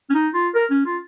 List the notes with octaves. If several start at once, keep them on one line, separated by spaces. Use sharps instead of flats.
C#4
D#4
F4
A#4
C#4
F4